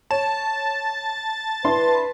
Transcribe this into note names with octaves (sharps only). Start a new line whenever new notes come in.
C#5 A5
D4 E4 B4 C6